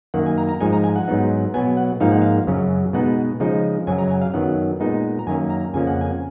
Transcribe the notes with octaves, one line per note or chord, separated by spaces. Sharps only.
F#2 D#3 A#3 F#5
G#5
A#5
A#5
G#2 F3 G#3 D#4 G#5
A#5
G#5
F#5
G#2 F#3 B3 D#4
B2 F#3 B3 G#5
F#5
G#2 F3 A#3 D#4 F5
F#5
F5
F#2 C#3 F#3 C#4
B2 G#3 B3 D#4 F#5
C#3 F3 G#3 D#4
F#2 C#3 F#3 G#5
A#5
G#5
F5
F#2 D#3 F#3 B3 F#5
A#2 G#3 B3 D#4
A#5
F#2 D#3 A#3 C#4 G#5
A#5
F2 C#3 F3 A#3 C#4 G#5
F#5
G#5